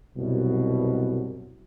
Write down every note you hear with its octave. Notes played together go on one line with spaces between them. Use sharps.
C2 F#2 B2